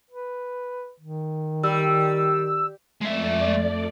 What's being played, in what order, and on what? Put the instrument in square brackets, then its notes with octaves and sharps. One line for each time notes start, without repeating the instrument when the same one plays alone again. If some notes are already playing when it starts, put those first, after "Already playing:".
[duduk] B4
D#3
[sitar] G3 [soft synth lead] E6
[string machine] F2 A3 D5 [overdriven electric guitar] G#3 E5